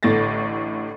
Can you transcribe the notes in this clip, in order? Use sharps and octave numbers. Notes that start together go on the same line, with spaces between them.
A1 A2 D3 A6 A#6